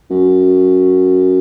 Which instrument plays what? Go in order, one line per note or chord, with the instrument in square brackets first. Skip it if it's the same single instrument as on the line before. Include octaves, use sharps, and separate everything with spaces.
[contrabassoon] F#2